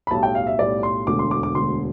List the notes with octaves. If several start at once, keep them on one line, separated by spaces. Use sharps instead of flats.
B5
B1 A2 G3 A5
G5
F5
E5
B1 A2 G3 D5
C6
E1 D2 D3 D6
C6
D6
D6
E1 D2 D3 C6